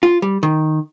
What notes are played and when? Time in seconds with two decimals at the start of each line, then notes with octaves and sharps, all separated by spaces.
0.03 F4
0.22 G3
0.43 D#3